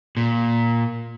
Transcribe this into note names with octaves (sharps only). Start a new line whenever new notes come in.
A#2